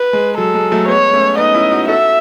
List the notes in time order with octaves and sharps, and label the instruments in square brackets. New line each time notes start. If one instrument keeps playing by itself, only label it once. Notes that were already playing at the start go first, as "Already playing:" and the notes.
Already playing: [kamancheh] B4
[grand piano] G#3
[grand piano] F#3 [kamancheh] A4
[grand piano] G#3
F#3 A3
[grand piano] G#3 B3 [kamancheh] C#5
[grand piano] A3 C#4
[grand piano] B3 D#4 [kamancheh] D#5
[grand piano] C#4 E4
D#4 F#4
[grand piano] F#4 A4 [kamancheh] E5